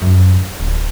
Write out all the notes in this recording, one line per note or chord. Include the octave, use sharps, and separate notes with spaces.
F#2
D1